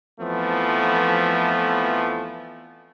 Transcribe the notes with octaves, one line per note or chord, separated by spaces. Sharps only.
F2 E3 F3 A3 B3